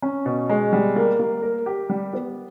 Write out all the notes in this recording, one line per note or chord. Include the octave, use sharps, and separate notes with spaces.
C#4
B2
G#3
G3
A#3
A#3
A#4
G4
G3
B3